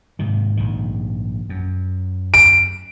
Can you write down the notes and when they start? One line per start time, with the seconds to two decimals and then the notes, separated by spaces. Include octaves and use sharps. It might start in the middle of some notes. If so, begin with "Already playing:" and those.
0.19 G#2 C3 D#3
0.57 A#1 G#2 D#3
1.49 F#2
2.34 D7